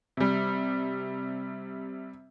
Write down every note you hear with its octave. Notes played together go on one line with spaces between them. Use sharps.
C3 G3